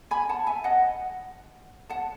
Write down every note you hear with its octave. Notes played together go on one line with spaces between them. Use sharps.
G#5 B5
F#5 A5
E5 G#5
D#5 F#5
F#5 A5